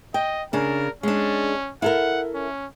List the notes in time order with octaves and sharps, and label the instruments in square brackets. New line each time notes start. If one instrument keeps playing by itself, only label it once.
[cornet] D#5 [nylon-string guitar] G5
[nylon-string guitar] C#3 D4 [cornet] A#4
[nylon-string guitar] G#3 D4 [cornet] C#4
[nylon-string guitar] E4 A4 A#4 [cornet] F#5
[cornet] C#4